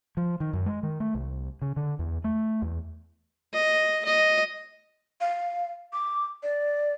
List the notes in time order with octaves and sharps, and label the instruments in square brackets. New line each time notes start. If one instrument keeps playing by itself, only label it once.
[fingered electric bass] F3
D#3
F#2
G#3
D#3
A3
C2
C#3
D3
E2
A3
E2
[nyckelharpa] D#5
D#5
[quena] F5
D6
D5